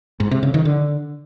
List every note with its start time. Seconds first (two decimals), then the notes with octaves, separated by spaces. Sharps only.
0.20 G#2
0.31 C3
0.43 C#3
0.54 D#3
0.65 D3